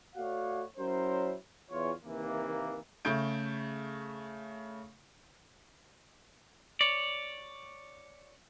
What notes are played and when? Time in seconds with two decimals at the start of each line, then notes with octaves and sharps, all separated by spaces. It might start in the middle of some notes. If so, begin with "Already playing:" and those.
0.15 A3 F#4 C#5 D5 F5 F#5
0.77 F#3 C#4 E4 A#4 C5
1.70 E2 F4 C#5
2.03 C3 D#3 E3 A#3
3.05 C#3 A3 G6 D7
6.81 C#5 D5